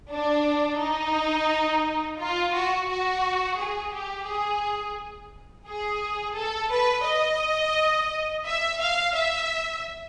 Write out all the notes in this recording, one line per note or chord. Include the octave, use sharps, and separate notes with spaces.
D4
D#4
F4
F#4
F#4
G#4
G4
G#4
G#4
A4
B4
D#5
E5
F5
E5